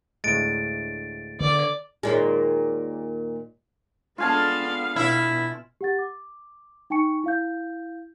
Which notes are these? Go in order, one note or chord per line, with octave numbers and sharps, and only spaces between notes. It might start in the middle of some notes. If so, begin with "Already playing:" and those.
D2 A2 G#3 A6 D7
D3 D5
D#2 A#2 G#3
G#3 B3 D4 F4 A4 F5 G#5 A5
B2 E4
G4 F#5 A6
D6
D#4 G5 G#5 C#6 C#7
E4 F5 G6